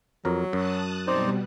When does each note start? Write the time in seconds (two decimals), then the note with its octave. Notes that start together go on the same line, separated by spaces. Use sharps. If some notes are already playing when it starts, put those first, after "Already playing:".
0.25 F2 F#3 A#4
0.53 F#2 A5 D#6 F#6
1.07 B2 G3 C4 D#4 C5 D5